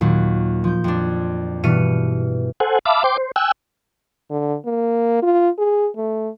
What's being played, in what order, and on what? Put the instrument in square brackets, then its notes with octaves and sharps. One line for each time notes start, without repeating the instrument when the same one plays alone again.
[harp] D#2 A#2 F#3
F3 G6
F2 D4
G2 B2 E3 F6 C#7 D#7
[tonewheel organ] A4 C5 F#5 G#5
E5 F5 A5 B5 D6
C5 G5 C6 D6
C5
G5 G#5 E6 F#6
[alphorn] D3
A#3
F4
G#4
A3